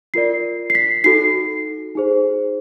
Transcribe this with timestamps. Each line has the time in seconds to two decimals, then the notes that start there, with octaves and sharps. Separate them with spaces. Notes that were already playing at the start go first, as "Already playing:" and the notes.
0.14 F4 A#4 D5 C7
0.70 C7
0.75 B6
1.04 D#4 F#4 A4 C7
1.95 D#4 G#4 C5